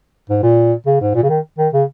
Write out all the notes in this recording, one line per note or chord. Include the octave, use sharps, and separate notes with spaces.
G#2
A#2
C#3
G#2
A#2
C#3
D#3
D#3
C#3